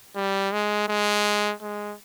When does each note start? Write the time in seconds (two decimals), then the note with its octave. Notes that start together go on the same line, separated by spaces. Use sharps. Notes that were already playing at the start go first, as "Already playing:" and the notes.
0.16 G3
0.52 G#3
0.89 G#3
1.62 G#3